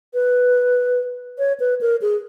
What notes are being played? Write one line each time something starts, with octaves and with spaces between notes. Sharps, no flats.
B4
C#5
B4
A#4
G#4